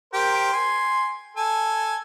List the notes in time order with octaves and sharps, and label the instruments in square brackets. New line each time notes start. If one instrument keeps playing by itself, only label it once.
[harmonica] G4 A#4 C5
G#5 C6
A4 G#5